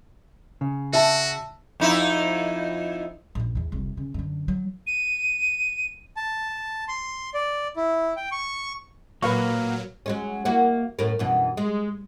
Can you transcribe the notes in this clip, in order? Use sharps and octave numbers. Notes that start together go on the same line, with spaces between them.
C#3
F#4 E5 A5
F2 D#4 E4
A#1 F#2
E2 E3
F1 C2
C#3
F#2 D3
F#3
D#7
A5
C6
D5
E4
G5
C#6
A#2 F#3 A#3 B4 F5 C#6
F#3 G#3 C#4
A#3 E4 F#4
F#2 A2 A#4
F#2 B2 E3
G#3